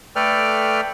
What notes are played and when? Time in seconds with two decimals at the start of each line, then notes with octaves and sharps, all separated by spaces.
0.16 A3 A4 B4 D5 G5 F6